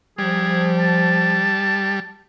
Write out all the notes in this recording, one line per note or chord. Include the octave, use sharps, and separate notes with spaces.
F3 G3 G#4
A5